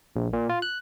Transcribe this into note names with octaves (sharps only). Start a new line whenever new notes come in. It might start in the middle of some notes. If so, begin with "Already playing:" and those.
A#1
A#2
F4
F#6